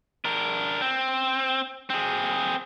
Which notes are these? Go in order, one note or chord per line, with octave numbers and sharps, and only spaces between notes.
D4 A#4
C4
C4 G#4